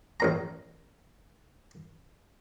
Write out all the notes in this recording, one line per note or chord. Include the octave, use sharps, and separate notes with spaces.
A1 A#2 A#5